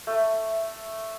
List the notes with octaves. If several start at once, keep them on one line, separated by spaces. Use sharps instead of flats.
A3